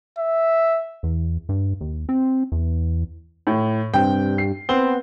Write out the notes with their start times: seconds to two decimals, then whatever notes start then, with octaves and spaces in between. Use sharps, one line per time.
0.18 E5
1.03 E2
1.49 G2
1.81 D#2
2.09 C4
2.52 E2
3.47 A2
3.94 G2 C3 G5
4.38 C7
4.69 B3 C4 G7